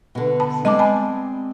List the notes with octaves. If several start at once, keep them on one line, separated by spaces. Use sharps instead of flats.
B2 D3
A5 B5
G#3 C4 D5 D#5 A5 D6
G#5 A5 B5